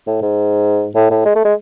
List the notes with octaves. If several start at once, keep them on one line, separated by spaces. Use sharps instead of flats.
A2
G#2
A2
A2
G#3
A3
G#3